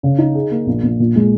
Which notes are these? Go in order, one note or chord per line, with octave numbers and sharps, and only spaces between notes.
C#3
D#4
G#4
A#3
A#1
A#1
A#2
G#3